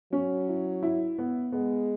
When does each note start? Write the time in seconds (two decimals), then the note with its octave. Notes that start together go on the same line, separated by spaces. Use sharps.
0.12 F#3 C#4
0.48 E4
0.83 E4
1.18 B3
1.52 G#3 B3